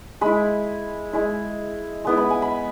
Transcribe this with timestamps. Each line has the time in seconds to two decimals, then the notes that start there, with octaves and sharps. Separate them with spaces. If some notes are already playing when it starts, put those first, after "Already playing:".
0.21 G#3 E4 B5
1.13 G#3 E4
2.05 G#3 B3 E4
2.17 B5
2.30 G#5
2.42 B5